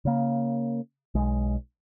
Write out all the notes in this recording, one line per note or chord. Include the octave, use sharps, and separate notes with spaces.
C#3 A#3
B1 G#3